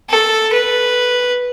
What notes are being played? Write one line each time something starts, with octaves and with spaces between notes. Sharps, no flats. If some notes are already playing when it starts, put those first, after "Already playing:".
A4
B4